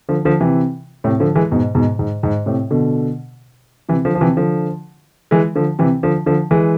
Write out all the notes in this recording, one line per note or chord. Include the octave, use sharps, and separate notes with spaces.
D3 F3
D3 F3
C3 E3
A2 C3
D3 F3
E3 G#3
G#2 B2
G#2 B2
G#2
G#2
A2 C3
B2 D3
C3 E3
D3 F3
F3
C3 E3
D3 F3
E3 G#3
D3 F3
C3 E3
D3 F3
D3 F3
E3 G#3